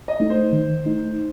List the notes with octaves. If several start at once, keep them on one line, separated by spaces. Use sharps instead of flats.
D#5
A3 D#4
C5
D#3
A3 D#4